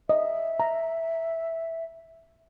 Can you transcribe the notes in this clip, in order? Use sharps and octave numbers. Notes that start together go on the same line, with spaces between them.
D#5 E5
A#5